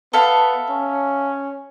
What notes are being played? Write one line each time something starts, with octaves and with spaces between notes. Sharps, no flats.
B3 A4 E5 F5
C#4